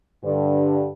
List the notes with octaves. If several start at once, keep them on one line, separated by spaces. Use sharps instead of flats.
G2 D3